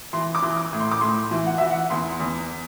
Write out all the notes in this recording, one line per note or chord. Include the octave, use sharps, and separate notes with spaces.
E3 C6
D6
E3
D6
A2
C6
D6
A2 C6
E3
F#5
E3 E5
F#5
E2 C6
E2